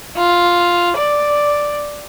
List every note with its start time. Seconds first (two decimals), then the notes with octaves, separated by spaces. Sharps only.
0.16 F4
0.97 D5